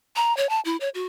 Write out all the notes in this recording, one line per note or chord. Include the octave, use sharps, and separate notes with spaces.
A#5
C#5
A5
E4
C#5
F#4